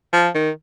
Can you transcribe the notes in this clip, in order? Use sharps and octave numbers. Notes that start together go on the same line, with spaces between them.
F3
D#3